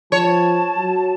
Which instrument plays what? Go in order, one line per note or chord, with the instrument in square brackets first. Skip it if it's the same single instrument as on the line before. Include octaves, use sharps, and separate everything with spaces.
[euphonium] F3 [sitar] C#5 [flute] A5
[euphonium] F#3